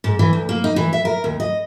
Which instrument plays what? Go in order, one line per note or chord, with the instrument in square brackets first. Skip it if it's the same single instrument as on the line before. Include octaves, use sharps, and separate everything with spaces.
[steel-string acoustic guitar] G#2
E3
D2
A#3
D#4
E3
E5
A#4
D#2
D#5